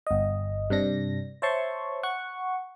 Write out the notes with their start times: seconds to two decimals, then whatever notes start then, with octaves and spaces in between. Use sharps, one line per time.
0.07 G1 D#5
0.70 G2 C3 D4 A#6
1.42 C5 C#5 E5 A5 C6 C#6
2.03 F#5 C#6